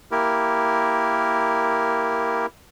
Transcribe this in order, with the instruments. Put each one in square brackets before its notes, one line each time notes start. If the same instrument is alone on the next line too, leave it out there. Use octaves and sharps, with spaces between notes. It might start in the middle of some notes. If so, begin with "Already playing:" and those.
[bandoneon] A#3 E4 G4 A#4